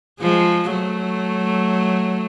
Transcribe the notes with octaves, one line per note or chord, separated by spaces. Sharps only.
F3 G#3
F#3 A3